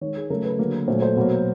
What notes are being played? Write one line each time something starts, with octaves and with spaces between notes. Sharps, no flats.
D#3 G#3 C#5
G#4
C#3 F#3 A3 A#4
B4
D3 F#3 A#3
A#2 F#3 A3 C5
C5
B2 F#3 A#3